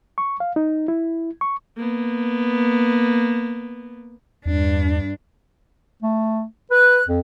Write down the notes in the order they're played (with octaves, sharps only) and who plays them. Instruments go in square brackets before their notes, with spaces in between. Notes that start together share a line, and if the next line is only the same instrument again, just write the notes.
[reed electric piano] C#6
F5
D#4
E4
C#6
[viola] A#3 B3
[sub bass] E2 [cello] G2 D4
[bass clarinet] A3
[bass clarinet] B4 [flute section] F#6
[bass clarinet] F2